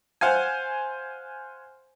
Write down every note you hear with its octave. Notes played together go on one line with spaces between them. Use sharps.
C5 F5 F#5 G#5